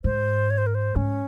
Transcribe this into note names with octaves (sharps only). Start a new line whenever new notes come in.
G#2 C5
C#5
C5
A#4
C5
G#2 C#4